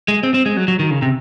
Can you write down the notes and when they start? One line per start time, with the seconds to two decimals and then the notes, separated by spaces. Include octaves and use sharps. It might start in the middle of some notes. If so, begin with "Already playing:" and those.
0.08 G#3
0.23 C4
0.34 C4
0.46 G#3
0.57 F#3
0.68 F#3
0.79 D#3
0.91 C#3
1.02 C3